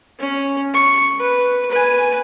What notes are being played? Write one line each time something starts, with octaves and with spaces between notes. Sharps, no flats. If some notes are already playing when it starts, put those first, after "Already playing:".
C#4
C#6
B4
B4 G#5